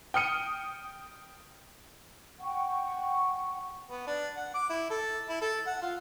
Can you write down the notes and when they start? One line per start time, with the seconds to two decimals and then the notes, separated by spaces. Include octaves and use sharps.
0.14 G5 D#6 F6 C#7 D#7
2.40 F#5 G5 C#6
3.91 B3
4.07 D4
4.37 F#5
4.54 D6
4.70 E4
4.90 A4
5.29 E4
5.42 A4
5.67 F#5
5.82 F4